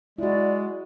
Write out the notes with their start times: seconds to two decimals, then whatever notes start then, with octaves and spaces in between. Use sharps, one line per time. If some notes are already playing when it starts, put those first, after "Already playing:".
0.18 G#3 E4 F#4 D5